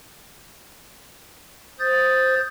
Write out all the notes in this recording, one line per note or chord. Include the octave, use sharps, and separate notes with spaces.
C5 D#6 G6 A6